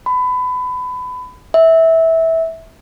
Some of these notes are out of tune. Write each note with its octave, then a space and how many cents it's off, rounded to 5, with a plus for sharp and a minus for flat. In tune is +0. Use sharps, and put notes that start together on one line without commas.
B5 +25
E5 -15